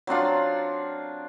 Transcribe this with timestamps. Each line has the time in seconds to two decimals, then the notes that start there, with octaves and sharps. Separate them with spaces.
0.07 F#3 C4 D4 F4